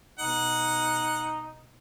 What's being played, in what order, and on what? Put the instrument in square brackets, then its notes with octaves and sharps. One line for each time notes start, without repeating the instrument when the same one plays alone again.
[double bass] B2 [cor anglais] D#4 [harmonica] F#5